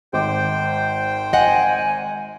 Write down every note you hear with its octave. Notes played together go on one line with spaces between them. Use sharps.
G#1 C5 G5 D6
D#5 F#5 G#5